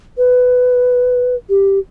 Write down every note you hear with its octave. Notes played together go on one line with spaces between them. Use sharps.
B4
G4